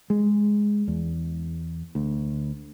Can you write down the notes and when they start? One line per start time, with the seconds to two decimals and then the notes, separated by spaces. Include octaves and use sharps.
0.10 G#3
0.88 E2
1.95 D2